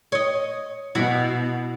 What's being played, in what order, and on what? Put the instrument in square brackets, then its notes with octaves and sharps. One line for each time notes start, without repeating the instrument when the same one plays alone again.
[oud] C#5 D#5
[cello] B2 [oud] E4 F#4